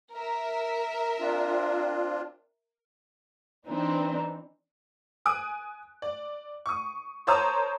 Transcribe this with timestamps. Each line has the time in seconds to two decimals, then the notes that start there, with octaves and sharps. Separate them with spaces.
0.13 A#4 E5
1.20 C4 D4 F4
3.67 E3 C4 D4 D#4
5.25 G#5 D#6 F#6 D7
6.02 D5
6.66 C#6 D#6
7.27 A#4 C5 C#5 A5 A#5 D#6